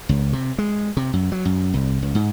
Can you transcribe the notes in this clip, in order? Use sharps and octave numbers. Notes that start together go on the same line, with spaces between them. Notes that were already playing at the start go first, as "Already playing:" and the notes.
C#2
C3
G#3
C3
F#2
F#3
F#2
C2
C#2
G#2